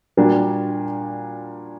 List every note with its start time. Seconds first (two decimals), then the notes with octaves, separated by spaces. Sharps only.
0.17 A#2 G3 A#3 D4 F#4